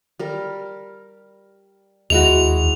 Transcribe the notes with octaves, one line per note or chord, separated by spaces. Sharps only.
G3 A#4
D#2 G#3 E4 F#4 F7